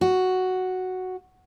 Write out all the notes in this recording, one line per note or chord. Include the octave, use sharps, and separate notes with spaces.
F#4